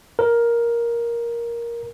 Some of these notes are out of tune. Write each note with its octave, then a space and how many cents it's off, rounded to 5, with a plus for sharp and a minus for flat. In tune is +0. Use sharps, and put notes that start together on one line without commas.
A#4 +10